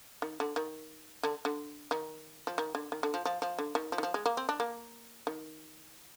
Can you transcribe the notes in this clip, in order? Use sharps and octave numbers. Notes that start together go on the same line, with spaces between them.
D#3
D3
D#3
D3
D3
D#3
F3
D#3
D3
D#3
D3
F3
F3
F3
D3
D#3
F3
D#3
F3
G#3
A#3
C4
D4
A#3
D#3